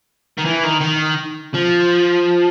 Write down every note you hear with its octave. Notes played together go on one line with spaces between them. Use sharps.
D#3
E3
D#3
D#3
F3